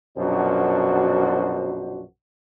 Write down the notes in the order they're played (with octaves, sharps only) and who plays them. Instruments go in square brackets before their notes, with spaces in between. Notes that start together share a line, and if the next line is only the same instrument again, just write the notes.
[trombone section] A#1 F#2 B2 D4 F#4 C5